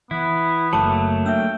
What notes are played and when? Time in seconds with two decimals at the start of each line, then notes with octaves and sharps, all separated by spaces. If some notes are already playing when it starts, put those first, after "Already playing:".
0.11 E3 B3 E4
0.73 F#1 F#3 A3 A#3 A5 D6
1.26 D4 E5 G5 D#6 E6